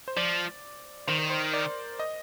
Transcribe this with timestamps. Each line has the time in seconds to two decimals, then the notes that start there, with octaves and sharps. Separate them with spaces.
0.08 C5
0.17 F3 D5
1.07 D#3 C5
1.19 A#4
1.30 C5
1.54 D5
1.99 D#5